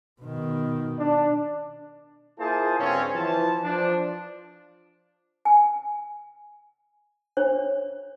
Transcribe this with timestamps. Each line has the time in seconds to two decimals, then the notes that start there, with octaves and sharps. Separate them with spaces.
0.22 B2 D#3
0.99 D4
2.39 A#3 E4 F4 G#4 C5 A5
2.79 G2 C#3 C4 C#4
3.15 E3 F3 A5
3.63 F3 D4
5.45 G#5
7.37 D4 C5 C#5